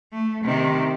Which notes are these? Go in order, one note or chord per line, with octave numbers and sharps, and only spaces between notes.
A3
C3 D#3